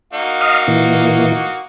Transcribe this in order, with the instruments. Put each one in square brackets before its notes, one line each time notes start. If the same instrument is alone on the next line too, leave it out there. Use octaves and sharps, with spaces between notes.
[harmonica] A#3 D#4 F#4
[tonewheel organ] D#5 F5
A#2 E3